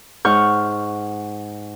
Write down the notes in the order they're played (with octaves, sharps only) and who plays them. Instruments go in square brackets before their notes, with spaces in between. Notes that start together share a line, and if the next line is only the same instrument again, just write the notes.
[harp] G#2 F#5 C#6 F6 G6